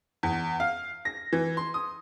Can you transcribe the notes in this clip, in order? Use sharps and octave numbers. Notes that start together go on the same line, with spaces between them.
E2
F5
A#6
E3
C6
D#6